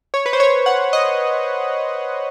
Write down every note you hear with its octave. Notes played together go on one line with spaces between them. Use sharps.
C#5
B4
C5
C#5
F#5
D#5